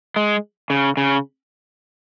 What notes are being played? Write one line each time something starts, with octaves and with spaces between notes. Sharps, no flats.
G#3
C#3
C#3